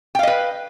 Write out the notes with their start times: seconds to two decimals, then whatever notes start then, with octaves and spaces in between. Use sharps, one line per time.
0.15 G5
0.19 F5
0.23 D#5
0.27 B4